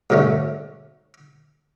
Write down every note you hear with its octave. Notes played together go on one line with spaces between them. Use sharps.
G#2 B2 D3 A3 C#4